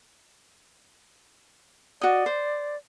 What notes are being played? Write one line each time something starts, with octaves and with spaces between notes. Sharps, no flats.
F#4 D5 D#5
C5